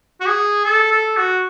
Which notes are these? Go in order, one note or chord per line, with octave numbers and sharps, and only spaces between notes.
F#4
G#4
A4
A4
F#4